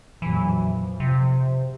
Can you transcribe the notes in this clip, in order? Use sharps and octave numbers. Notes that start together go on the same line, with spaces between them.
A#1 F2 E3 F#3
F3
C3